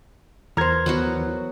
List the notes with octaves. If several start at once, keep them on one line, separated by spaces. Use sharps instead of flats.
E2 E3 A#4 C5 G#6
D#2 F#3 B3 F#4